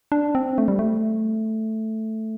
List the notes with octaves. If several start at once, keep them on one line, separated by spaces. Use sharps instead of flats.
D4
C4
A3
G3
A3